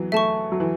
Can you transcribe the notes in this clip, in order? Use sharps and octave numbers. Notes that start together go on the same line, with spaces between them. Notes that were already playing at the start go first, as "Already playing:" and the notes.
Already playing: E3 F#3 B3
A3 E5 A5 C#6
F#3
E3